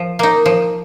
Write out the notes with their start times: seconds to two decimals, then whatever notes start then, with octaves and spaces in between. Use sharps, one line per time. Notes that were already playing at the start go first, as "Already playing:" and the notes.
Already playing: F3
0.19 A#3 D#4
0.46 F3